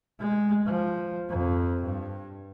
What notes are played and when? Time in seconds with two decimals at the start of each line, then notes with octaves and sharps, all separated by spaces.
0.19 G#3
0.66 F3
1.29 F2
1.83 G2